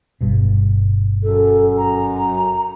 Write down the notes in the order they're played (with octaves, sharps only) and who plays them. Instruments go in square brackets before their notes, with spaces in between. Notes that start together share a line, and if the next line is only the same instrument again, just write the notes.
[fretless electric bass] G1 G2 B2
[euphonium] F#2 [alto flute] A4
[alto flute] A#5